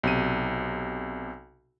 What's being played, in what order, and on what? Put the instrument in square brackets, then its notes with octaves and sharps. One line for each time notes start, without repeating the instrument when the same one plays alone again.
[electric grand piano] B1 C3 D#7